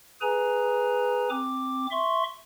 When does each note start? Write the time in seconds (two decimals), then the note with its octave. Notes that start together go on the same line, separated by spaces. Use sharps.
0.21 G#4 B4 G#5 A#5
1.30 C4 D6
1.91 E5 C6 C#6